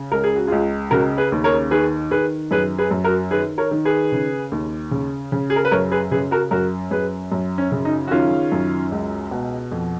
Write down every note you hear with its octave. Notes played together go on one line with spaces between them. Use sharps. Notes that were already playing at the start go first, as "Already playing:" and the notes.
Already playing: C#3
C#2 A#4
G#4
F#4
C#2 F4 G#4
C#3 F#4 A#4
G#4 B4
D#2
A#4 C#5
D#3 G#4 B4
D#3 G#4 B4
F#2 G#4 B4
G#4 B4
F#2
F#4 A#4
D#3 G#4 B4
A#4 C#5
D#3
G#4 B4
C#3
D#2
C#3
C#3
G#4
A#4
B4
F#2 A#4 C#5
G#4 B4
C#3 G#4 B4
F#4 A#4
F#2 F#4 A#4
F#2 G#4 B4
F#2
C#4
C#3
D#4
F#4
D#3 C#4 F4
F#2
C#2
B2
F2